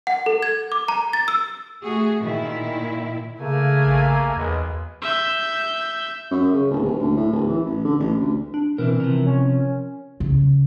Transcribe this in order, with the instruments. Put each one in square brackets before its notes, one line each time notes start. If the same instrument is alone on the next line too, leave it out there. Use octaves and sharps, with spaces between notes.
[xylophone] F#5
A4
G#6
D6
A#5
A6
E6
[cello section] A3 F#4 G#4
A#2 D#3 E4
[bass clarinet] C#3 [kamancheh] A3 G#5 [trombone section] A#3
[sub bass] A1
[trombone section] B1 G#3 B3 [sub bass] E2
[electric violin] E5 G6
[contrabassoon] F#2
C#3
D1
D#1
D2
A2
D1
E3
A1
D3
A1
D2
[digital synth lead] D4
[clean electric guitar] B2 C4 D4 [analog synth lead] E3 [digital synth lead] A#4
[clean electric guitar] C3 F3
[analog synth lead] C#4
[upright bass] C#3